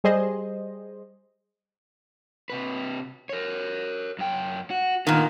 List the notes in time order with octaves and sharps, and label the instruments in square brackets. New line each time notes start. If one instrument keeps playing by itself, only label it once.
[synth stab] G3 G#4 C5 D#5
[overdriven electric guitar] C3 B4
A#4 C#5
F#2 G5
F#4
[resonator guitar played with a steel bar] A#2 D#3 [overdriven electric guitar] B3 A#4